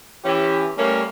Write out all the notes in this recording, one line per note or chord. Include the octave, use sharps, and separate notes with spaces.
E3 C#4 G4
G3 A3 A#3 C#4